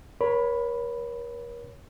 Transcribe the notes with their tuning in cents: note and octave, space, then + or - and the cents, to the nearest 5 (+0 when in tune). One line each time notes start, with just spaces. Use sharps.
A#4 +40 C#5 +0 B5 +0